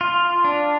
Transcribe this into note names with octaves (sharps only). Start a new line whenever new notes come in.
F4
D4